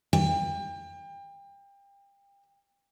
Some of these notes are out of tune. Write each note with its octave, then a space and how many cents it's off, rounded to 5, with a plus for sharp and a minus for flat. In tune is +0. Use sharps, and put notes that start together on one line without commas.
G5 +30